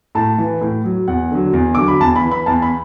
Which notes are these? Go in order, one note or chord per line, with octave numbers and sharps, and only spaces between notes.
A2 A5
E3
A2
F#3
E2 F#5
D3 F#3
E2
D3 F#3 D6
B5
E2 A5
B5
E3
B5
E2 A5
B5